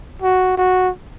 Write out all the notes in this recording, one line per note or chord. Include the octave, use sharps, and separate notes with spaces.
F#4
F#4